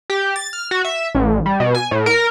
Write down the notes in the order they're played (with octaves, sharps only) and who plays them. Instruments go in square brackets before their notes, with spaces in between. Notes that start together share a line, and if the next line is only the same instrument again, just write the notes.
[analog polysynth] G4
A6
F6
F#4
E5
A1
G3
B2
G#5
A2
A#4